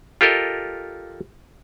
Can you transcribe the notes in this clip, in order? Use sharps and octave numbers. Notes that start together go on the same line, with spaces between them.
F4 G4 A4 A#4 D#5